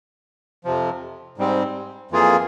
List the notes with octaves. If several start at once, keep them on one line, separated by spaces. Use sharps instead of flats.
F2 C3 F3
G#2 G3 C4
F2 E3 A#3 F4 G#4